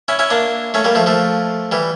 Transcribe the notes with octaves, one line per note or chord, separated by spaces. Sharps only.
C#4 E4
C#4 E4
A#3 D4
A3 C#4
G3 A#3
F3 A3
F3 A3
E3 G3